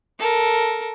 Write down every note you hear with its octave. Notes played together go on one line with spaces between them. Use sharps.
A4 A#4